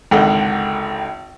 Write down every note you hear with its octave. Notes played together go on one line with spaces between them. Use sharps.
G#1 C#2 D3 D#3 F#5 G5